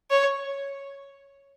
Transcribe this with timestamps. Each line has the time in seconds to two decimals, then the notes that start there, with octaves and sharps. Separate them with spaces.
0.11 C#5